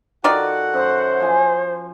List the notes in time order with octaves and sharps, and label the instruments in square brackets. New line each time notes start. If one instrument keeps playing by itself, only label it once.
[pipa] D#3 F4 D5 [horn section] F#4 A4 F#5
[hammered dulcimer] F#2 [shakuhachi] C5
[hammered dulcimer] F3 G#5